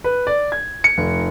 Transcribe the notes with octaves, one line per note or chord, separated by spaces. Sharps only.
B4
D5
G#6
C#7
F1